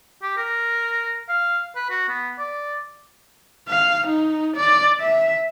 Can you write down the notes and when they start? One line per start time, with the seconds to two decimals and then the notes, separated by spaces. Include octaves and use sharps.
0.23 G4
0.37 A#4
1.29 F5
1.76 B4
1.90 F#4
2.09 B3
2.39 D5
3.69 F5
4.07 D#4
4.56 D5
5.00 E5